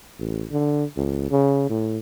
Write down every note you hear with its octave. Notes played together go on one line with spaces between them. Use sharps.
A1
D3
C#2
C#3
A2